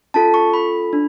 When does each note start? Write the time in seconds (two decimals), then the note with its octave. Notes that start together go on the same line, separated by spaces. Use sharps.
0.14 C#4 F4 A4 A5
0.34 C#6
0.54 B5
0.93 D4